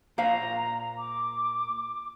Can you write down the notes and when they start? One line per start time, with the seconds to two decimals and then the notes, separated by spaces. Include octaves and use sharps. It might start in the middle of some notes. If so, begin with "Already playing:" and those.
0.18 A#2 C5 F5 A#5
0.98 D6